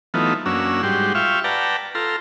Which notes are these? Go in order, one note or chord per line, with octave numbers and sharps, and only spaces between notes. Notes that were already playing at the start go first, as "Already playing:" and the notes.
E3 F#3 A3 B3 D#4 F4
F#2 A#3 C#4 D4 F#4 E6
G#2 G3 F#4 G4 C6
F4 E5 F5 G5 C#6
B4 D5 F#5 G5 A5 A#5
F4 A4 A#5 C6